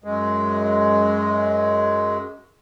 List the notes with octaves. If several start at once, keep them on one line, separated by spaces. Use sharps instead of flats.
F#2 G#3